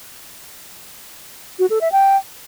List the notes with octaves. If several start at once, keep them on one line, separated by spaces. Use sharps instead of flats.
F#4
A4
E5
G5